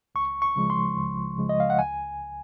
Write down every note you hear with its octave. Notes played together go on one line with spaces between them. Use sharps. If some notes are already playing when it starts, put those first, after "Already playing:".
C#2 C#6
C#6
C#3 F3 G#3
C6
C#2
C#3 F3 G#3
D#5
F5
F#5
C#2 G#5